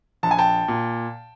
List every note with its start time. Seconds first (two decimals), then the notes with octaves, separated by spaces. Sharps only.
0.23 A#1 A5
0.31 G#5
0.38 G5 A5
0.68 A#2